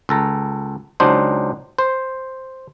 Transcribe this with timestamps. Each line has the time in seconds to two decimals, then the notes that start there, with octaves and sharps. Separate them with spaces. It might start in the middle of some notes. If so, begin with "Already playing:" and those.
0.09 C#2 A4 A#5
1.00 C#2 F#3 D4 D#4 C5
1.79 C5